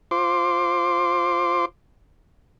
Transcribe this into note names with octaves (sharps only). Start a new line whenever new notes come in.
F4 C5 C6 D6